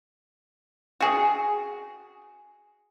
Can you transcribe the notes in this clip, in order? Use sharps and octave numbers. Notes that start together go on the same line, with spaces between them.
F#4 G#4